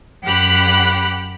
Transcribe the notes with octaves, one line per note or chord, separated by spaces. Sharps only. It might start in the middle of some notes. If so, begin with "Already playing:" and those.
F#2 G4 F#5 B5 F#6